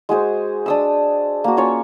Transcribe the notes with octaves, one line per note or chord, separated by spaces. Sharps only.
G#3 F#4 G#4 C5
D4 D#6 E6
A#3 F#4
C#4 F4 C#5